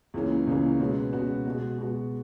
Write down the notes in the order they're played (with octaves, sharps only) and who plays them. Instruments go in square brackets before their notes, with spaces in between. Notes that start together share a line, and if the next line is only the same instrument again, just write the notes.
[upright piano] C#2 C#3 E3 A#3 C#4
C#2 C#3 E3 A#3 C#4
B2 G#3 C#4 F#4 B4
B2 G#3 C#4 F#4 B4
B2 G#3 B3 F#4
B2 G#3 B3 F#4